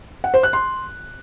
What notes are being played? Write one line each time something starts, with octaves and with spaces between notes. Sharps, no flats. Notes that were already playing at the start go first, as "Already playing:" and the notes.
F#5
C5
F#6
C6